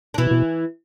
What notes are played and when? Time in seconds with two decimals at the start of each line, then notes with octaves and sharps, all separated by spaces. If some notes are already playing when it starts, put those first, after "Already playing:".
0.14 D4
0.18 B2 E3 E4
0.31 B2